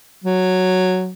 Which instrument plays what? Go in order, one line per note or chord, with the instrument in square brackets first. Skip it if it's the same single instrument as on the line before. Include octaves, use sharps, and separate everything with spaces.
[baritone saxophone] F#3